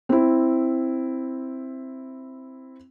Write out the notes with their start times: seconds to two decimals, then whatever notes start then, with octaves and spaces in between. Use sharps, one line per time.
0.09 C4 E4